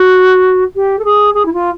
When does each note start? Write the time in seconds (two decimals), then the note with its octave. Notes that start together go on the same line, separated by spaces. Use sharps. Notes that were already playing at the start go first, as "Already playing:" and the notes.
Already playing: F#4
0.75 G4
0.99 A4
1.04 G#4
1.34 G#4
1.45 E4
1.53 F4